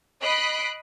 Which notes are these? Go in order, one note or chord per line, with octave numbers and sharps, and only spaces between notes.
D#5 B5 F#6 B6 C7 D7